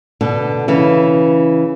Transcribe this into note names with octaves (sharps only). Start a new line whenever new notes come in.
B2 D3
C#3 E3